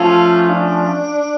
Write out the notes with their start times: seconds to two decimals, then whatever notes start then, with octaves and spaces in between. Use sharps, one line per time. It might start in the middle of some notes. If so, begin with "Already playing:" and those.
Already playing: F3 A3 C#4 F4
0.49 D4